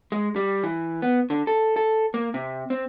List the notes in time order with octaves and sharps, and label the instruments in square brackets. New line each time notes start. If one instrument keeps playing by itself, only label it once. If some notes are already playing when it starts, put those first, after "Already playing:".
[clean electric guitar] G#3
G3
E3
B3
D3
A4
A4
A#3
C3
C4